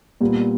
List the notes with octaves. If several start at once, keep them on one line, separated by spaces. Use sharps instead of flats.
A#2 G3 B3